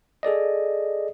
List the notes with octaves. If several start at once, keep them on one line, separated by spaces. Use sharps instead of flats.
G#4 A4 D5 D#5